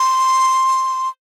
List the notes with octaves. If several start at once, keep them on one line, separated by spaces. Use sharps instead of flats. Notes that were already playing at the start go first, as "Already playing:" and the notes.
Already playing: C6